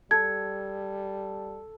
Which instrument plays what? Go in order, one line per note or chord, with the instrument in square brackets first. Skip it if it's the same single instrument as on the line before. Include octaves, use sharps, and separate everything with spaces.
[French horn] G3 [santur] A4 [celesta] G#6